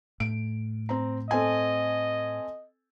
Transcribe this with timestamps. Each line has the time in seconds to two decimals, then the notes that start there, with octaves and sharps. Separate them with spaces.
0.20 A2 D7
0.89 C4 A#5
1.31 C4 A4 D#5 G#5